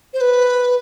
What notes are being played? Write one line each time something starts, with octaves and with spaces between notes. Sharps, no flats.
C5
B4